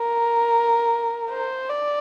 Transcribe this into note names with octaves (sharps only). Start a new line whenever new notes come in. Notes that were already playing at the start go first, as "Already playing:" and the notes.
Already playing: A#4
C5
D5